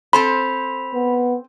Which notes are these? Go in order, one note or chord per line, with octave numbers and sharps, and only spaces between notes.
C4 A4 C5 B5
B3